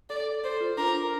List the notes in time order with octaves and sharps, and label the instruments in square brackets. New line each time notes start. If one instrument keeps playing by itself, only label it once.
[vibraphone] A4 [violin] D5
[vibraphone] A4 [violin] C5
[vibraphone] F4
[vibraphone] D4 [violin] A#4
[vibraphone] D4